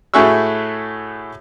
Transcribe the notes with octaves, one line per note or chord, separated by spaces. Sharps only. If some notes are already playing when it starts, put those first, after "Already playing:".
A2 A3 F#4 G#4 C#6 E6